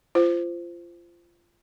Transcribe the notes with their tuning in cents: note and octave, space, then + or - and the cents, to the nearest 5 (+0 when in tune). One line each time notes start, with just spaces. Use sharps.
F4 -25 C5 -10